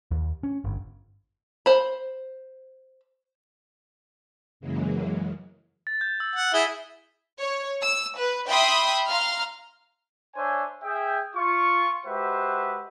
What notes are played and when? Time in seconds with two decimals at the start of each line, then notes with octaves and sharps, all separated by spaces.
0.11 D#2
0.43 C#4
0.64 G1
1.66 C5 B5
4.60 F#2 C#3 E3 F#3 G#3 A#3
5.87 A6
6.01 G6
6.20 E6
6.35 F#5
6.54 E4 G#4 B6 G7
7.39 C#5
7.81 E6
8.17 B4
8.49 E5 G5 B5 C6 D#6
9.08 F5 A#5 C6 F6
10.36 D4 C5 C#5 E5 G#5
10.83 G#4 E5 G5
11.36 F4 C#6
12.06 G#3 F#4 G4 B4 C5 E5